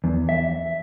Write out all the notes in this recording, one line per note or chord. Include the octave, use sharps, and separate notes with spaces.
E2
E5